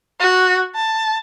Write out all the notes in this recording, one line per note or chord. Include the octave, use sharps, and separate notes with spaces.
F#4
A5